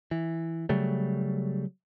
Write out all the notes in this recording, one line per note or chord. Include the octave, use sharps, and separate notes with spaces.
E3
C#3 F#3 G3 A3